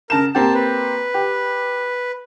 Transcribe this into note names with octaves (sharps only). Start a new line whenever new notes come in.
C#3 A#4 A5 E7
A#3 C4 G4 A5
B4
G4